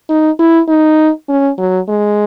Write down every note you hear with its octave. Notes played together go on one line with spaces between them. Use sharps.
D#4
E4
D#4
C#4
F#3
G#3